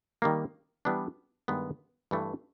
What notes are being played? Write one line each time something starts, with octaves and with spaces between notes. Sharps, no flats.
D#3 G3 A#3
E3 G3 B3 D4
G2 D#3 G#3 B3
G2 E3 A3